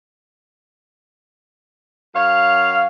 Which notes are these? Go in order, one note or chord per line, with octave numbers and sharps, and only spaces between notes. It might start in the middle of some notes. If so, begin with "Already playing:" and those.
F#2 C#5 F5